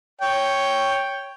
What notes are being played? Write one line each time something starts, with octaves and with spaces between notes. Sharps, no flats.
C#5 G5